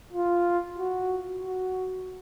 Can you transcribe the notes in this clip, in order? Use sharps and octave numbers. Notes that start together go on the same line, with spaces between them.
F4
F#4
F#4